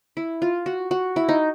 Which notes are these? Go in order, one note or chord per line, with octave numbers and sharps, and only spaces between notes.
E4
F4
F#4
F#4
E4
D#4